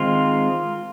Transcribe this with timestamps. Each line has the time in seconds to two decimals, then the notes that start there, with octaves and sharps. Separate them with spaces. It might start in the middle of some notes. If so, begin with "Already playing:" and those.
Already playing: D#3 G#3 C4 F4